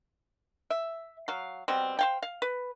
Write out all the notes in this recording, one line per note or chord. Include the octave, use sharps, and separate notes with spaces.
E5
F#3 F5
B2 G3 C4
C5 F5 G5
F5
B4